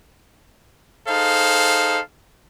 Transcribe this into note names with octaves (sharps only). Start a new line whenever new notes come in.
D#4 G#4 A4 C5 F5